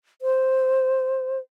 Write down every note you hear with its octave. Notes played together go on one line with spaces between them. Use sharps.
C5